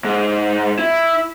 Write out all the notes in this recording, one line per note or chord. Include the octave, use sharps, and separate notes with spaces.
G#2
E4